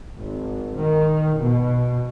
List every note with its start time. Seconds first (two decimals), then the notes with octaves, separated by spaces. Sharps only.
0.17 G#1
0.76 D#3
1.38 B2